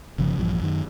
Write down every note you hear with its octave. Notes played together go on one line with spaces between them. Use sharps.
G1 C#3 F3
A#1 G2 E3 F3
F#2 D#3